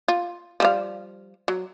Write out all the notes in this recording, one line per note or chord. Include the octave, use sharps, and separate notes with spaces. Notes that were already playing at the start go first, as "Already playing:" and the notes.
F4
F3 G3 F5
F#3